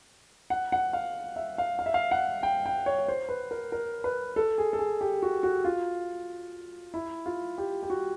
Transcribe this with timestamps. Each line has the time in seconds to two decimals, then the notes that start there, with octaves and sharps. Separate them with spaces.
0.50 F#5
0.72 F#5
0.93 F5
1.36 E5
1.58 F5
1.79 F5
1.86 E5
1.94 F5
2.11 F#5
2.43 G5
2.66 G5
2.86 C#5
3.08 C5
3.29 B4
3.51 A#4
3.72 A#4
4.04 B4
4.36 A4
4.58 G#4
4.73 A4
4.79 G#4
5.01 G4
5.22 F#4
5.43 F#4
5.65 F4
6.94 E4
7.26 F4
7.58 G4
7.83 G4
7.90 F#4